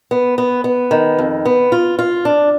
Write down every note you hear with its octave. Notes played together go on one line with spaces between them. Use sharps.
B3
B3
B3
D#3
F2
B3
F4
F4
D4